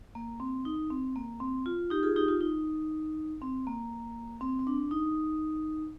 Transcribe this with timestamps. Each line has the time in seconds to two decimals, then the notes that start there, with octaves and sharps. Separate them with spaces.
0.15 A#3
0.40 C4
0.65 D#4
0.90 C4
1.16 A#3
1.40 C4
1.66 F4
1.90 D#4 G4
2.03 F4 G#4
2.16 D#4 G4
2.28 F4
2.41 D#4
3.42 C4
3.67 A#3
4.41 C4
4.59 C4
4.67 D4
4.91 D#4